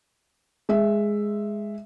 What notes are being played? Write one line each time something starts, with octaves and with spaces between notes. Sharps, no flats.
G#3 E5